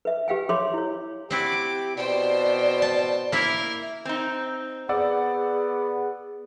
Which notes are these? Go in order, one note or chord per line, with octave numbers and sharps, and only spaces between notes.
B4 E5
G4 B4 F5 G5 G#5
C#5 E5 B5 C6 D6
E4 C#5
C4 E4 F#4 G4 D6
B2 C5 D5 G5
A5
A#3 E4 A#4 E5
C4 D#4
B3 G#4 D5 F#5 E6